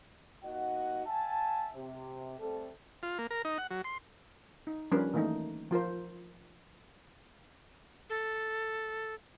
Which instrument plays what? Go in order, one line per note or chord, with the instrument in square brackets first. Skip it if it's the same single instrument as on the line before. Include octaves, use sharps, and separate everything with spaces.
[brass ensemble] D#2 A#3 D#4 F#4 D#5 F#5
E5 F#5 G#5 A5
C3
G3 A3 C4 A4
[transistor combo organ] F4
A#3
A#4
D#4
F#5
F#3
C6
[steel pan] D#4
F3 G3 C#4 D4 A#4 B4
D#3 E3 A3 A#3 D#4
F3 F4 A#4 C5
[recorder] A4